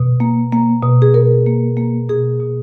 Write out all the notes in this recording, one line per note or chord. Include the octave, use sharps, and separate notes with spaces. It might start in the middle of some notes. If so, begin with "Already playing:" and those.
Already playing: B2
A#3
A#3
B2
G#4
B2 A#4
A#3
A#3
B2 G#4
B2